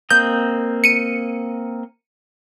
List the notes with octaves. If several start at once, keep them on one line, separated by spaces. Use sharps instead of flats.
A#3 C4 D#5 G6
C#7 D#7